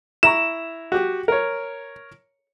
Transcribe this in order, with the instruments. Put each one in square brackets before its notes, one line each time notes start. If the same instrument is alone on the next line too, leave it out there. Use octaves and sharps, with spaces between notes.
[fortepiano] E4 A#5 C#6 [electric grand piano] E7
[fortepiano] F#4 G4
A#4 C#5